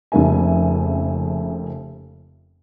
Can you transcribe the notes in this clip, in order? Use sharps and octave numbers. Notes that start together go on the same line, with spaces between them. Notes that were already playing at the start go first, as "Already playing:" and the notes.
F1 F2 C#3 A#3 E5 G#5